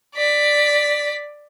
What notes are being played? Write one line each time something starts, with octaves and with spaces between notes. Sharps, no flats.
D5 B6